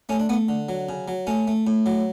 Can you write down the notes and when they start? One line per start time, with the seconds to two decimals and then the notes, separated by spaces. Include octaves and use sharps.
0.09 A3 C#4
0.20 D4
0.29 A3 B3
0.49 D3
0.69 F#3
0.89 C#3
1.08 F#3
1.27 A3 C#4
1.48 A3
1.67 A2
1.86 F#3